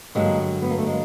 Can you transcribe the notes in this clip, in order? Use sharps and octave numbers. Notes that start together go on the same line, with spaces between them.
G2 D3 F#3 G#3 A#3
B3
A#3
A3
G#3 A#3